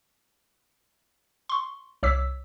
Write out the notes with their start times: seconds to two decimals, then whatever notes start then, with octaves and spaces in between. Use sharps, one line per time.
1.49 C6 C#6
2.03 C2 C#5 D6 E6 B6